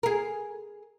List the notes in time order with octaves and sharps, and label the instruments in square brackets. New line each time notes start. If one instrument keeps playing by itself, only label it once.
[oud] G#4 A#4